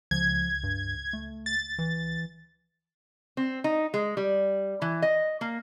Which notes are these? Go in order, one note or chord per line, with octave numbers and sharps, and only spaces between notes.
C#2 F3 G#6
G2
A3
A6
E3
C4
D#4
G#3
G3
E3
D#5
A#3